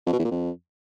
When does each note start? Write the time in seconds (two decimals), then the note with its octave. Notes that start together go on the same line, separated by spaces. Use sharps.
0.06 F2
0.13 B2
0.19 E2
0.25 A#2
0.31 F2